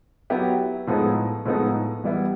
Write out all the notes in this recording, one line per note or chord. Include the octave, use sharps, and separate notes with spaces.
F#3 B3 E4 G4
A2 F3 G#3 B3 D#4
A2 F3 G#3 B3 D#4
E3 G3 B3 E4